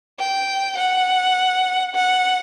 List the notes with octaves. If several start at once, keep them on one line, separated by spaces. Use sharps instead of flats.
G5
F#5
F#5